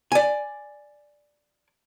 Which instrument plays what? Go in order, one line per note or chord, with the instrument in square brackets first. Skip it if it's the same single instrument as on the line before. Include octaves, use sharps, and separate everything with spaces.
[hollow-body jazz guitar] D5 G#5